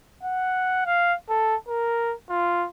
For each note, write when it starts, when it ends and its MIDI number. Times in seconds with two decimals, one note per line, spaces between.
0.23 0.84 78
0.86 1.14 77
1.29 1.56 69
1.68 2.13 70
2.29 2.67 65